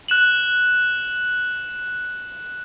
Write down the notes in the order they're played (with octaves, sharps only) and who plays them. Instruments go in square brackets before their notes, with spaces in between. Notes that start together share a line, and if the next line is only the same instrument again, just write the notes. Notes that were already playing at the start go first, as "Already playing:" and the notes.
[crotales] F#6 E7 F#7